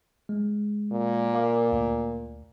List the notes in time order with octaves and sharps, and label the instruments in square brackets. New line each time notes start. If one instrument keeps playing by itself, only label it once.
[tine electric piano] G#3
[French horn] A#2
[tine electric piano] A#4 F5 D6
D2